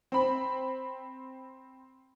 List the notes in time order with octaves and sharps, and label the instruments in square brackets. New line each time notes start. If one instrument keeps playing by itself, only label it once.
[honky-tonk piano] C4 B5